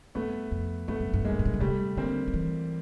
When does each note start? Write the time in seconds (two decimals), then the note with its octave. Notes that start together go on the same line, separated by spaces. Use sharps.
0.15 G2 A3 B3
0.51 F2
0.88 G2 A3 B3
1.00 F#2
1.14 G2
1.25 G#3 A#3
1.32 G#2
1.39 A2
1.46 A#2
1.54 B2
1.60 C3 G3 A3
1.97 D3 A#3 C4
2.28 D#3
2.34 E3